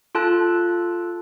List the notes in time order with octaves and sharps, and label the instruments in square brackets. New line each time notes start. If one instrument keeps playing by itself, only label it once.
[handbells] F4 A4 A5 F#6